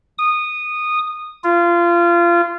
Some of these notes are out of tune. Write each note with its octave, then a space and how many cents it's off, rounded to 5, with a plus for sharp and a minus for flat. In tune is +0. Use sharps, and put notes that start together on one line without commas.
D#6 -15
F4 -25